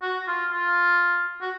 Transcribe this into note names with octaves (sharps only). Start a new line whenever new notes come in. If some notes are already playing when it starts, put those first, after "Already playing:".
F#4
F4
F4
F#4